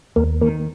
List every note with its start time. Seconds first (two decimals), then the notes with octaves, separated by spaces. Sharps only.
0.16 D#2 A#3
0.41 D#3 A#3